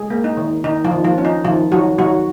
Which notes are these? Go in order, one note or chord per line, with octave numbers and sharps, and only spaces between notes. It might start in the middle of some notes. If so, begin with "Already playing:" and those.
Already playing: G#3 G#4
A#3
D#4
D#3
D#3 D#4
F3 F4
D#3
F3 F4
C#4
D#4
D#3 F3 F4
D#3 F#3 F#4
D#3 F#3 F#4